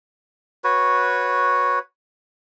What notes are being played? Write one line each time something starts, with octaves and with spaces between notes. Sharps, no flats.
F#4 B4 C#5